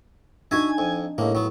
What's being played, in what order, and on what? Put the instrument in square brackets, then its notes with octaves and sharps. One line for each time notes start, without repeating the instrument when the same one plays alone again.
[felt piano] D4 D#4 [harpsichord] F#4 E5 [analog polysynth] G#5 G#6
[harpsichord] F2
[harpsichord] C#2 A#3 [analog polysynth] A2
[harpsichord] F#3 B3